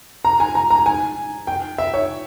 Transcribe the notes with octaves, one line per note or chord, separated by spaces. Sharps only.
A#5
G#5
A#5
A#5
G#5
G5
E5
C#5